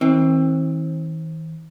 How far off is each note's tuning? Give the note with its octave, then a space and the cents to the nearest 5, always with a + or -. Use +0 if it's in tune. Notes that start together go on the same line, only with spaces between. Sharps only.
E3 -45 C4 +25